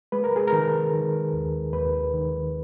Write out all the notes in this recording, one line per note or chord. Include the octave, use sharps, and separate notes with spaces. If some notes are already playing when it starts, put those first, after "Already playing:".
G#3 B4
A#4
G#4
A#4
D#3
D#3
D#2
D#2 B4
D#3